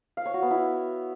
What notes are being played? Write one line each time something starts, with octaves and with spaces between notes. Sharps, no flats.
F5
C#5
F#4
B3
E4